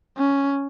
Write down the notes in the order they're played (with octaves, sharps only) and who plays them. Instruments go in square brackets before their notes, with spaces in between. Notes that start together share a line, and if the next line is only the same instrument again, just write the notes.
[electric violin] C#4